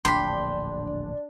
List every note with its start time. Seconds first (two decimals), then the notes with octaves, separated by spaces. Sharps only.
0.05 D1 A#1 E2 D4 G5 B5 C6